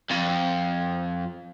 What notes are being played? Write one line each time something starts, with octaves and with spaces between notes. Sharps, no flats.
F2